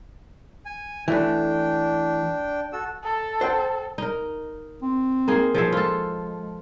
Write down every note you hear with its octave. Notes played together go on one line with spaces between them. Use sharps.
G#5
E3 A3 D4 G5
F#4 A4 E6
A4
C5 F#5 G5
D#4 A#4
C4
A#3 D#4 G#4
F3 G#4 E5
G#3 F4 A4